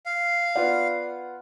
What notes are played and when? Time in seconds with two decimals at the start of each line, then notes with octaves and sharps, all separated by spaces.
0.06 F5
0.56 B3 F4 D5 F#5